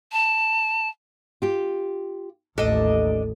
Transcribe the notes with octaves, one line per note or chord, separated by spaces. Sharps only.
A5
F4 G4
A1 D#2 D4 A4 D#5